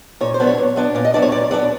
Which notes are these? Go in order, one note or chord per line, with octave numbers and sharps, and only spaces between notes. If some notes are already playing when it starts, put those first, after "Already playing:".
A#2 C#5
C5
F#3 B3 D4
C#5
A#2
F#3 B3 D4
A#2 D5
D#5
F#3 B3 D4 D5
C#5
A#2 D5
F#3 B3 D4 D5